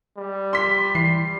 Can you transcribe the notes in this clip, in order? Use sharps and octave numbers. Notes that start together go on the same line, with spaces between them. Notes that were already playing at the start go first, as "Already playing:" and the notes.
G3
C6 B6
E3 C7